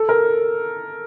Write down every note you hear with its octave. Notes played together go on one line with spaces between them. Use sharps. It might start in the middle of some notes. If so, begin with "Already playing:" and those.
Already playing: A4
A#4